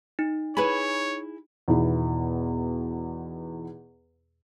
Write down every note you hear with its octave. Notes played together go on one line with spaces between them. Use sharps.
D#4
E4 G#4 B4 C#5 G#5 B5
E2 B2 D#3 E4